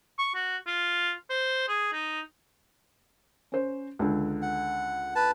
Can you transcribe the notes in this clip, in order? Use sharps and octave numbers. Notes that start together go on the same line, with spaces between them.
C#6
F#4
F4
C5
G#4
D#4
C#4 C5
C#2 D3
F#5
B4 A5